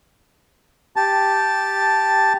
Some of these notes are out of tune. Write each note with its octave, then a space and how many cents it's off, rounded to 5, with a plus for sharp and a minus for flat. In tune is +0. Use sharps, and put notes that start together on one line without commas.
G4 +0 A5 +0